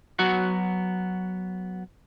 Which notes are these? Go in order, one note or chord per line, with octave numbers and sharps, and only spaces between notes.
F#3 B3 F#4 F#5